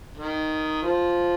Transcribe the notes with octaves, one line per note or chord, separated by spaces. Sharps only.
D#3
F3